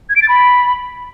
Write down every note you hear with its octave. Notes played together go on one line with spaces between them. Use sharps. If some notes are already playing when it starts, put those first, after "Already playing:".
G#6
D7
A6
B5